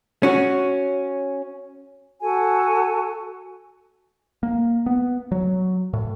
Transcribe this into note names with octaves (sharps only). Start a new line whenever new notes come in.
C#4 F#4
F#4 A4 F#5 G#5
A#3
B3
F#3
A2